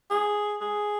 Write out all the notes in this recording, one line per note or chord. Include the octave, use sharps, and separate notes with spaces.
G#4
G#4